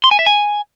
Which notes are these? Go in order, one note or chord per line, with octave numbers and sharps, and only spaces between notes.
C6
G#5
E5
G#5